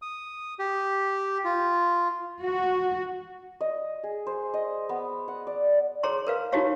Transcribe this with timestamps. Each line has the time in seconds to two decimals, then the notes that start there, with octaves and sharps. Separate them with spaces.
0.02 D#6
0.59 G4
1.45 F4
2.43 F#4
3.61 D#5
4.03 G#4
4.27 C5
4.54 D#5
4.89 B3
5.28 F#5
5.47 D5
6.03 G#4 C#5 A#5 C6
6.27 A#4 B4 F5
6.52 D#4 E4 F#4 G4 C#5 F5